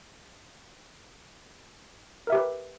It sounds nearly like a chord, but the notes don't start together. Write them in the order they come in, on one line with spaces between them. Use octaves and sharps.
A#4 E5 G4 B4